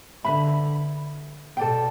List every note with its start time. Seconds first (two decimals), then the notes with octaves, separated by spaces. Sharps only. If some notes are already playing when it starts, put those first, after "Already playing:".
0.24 D3 B4 E5 B5
1.57 B2 A4 D5 G5